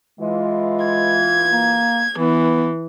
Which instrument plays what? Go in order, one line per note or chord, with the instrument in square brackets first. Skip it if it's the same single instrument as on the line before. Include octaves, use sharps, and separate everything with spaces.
[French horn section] E3 F4 [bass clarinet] G#3
[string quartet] G#6
[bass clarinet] A#3
[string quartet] E3 [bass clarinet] B3